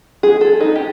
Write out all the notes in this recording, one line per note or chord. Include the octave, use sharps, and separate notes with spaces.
G#4
A4
D#4
G4